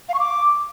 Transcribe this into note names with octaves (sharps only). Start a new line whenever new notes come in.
F5
C#6
D6